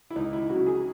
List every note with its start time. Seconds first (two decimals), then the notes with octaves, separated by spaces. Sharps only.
0.10 E4
0.16 C#2 D#4
0.33 E4
0.49 C#3 F#3 F#4
0.66 G#4